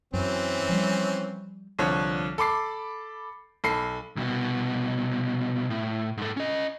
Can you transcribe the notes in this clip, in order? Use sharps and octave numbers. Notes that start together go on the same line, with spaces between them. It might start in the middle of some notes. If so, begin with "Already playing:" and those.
F#2 E3 C4 C#4
F3 G3
C2 D3 F3 C#5
A4 B5 D6 C7
B1 A4 B5 C7
C2 B2
A2
G#2 A4
C#4 D#5